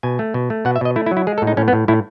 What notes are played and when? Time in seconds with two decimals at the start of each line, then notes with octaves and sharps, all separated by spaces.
0.03 B2 G#5
0.19 A3
0.34 B2
0.50 A3
0.65 B2 F#5
0.76 E5
0.81 B2 D#5
0.96 A3 E4
1.06 E4
1.11 F#3
1.17 E4
1.27 G#3 G#4
1.38 A4
1.42 A2
1.47 D#4
1.57 A2 C#4
1.68 B3
1.73 A2
1.88 A2 E4